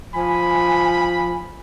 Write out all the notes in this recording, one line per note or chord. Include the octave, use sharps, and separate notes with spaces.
F3 G#5 B5